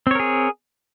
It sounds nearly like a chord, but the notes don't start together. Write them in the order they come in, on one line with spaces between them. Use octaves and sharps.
C4 C#5 A#4 G#4